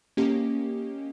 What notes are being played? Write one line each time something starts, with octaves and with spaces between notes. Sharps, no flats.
A#3 C#4 G4 D#5